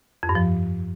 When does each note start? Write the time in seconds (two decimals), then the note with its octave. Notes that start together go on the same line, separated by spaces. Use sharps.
0.23 F2
0.29 G2
0.35 F3